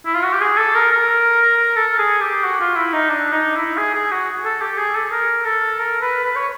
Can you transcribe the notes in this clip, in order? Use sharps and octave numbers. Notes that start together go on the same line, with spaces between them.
E4
F4
F#4
G4
G#4
A4
A#4
A#4
A4
G#4
G4
F#4
F4
E4
D#4
D4
D#4
E4
G#4
G#4
F#4
A4
G4
G#4
A4
A#4
A4
A#4
B4
B4
C#5